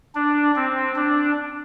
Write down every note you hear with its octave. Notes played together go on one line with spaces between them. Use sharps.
D4
C4
D4